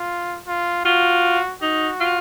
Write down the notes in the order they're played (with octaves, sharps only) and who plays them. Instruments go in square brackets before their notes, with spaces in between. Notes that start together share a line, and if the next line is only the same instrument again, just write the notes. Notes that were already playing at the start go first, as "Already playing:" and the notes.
Already playing: [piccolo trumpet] F4
F4
[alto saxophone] F4 [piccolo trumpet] F#4
[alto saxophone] D#4 [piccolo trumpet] F#4
[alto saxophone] F4